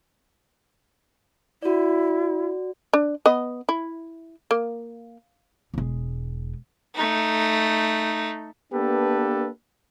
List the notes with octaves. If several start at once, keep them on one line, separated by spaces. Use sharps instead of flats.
E4 F#4 D5
D4
B3 D#5
E4
A#3
E1 G#3
A3 D#4
A#3 B3 D4 G4 A4 B4